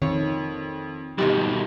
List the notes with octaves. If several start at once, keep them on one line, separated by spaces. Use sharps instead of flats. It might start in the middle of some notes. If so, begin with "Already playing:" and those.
F2 D#3 C#5
F2 G#2 B2 D#3 G3 G4